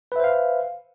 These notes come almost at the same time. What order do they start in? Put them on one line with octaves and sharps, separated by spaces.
B4 E5 C5 F5